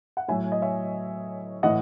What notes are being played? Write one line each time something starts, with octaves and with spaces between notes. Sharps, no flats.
F#5
A2 F#3 E5 G#5
D#5
C#5 E5
A2 E3 D#5 F#5